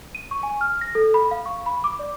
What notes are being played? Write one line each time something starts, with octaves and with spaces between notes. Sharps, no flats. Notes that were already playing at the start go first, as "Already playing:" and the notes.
D#7
C#6
G#5
F6
A#6
A4
B5
F5
C#6
B5
D6
D5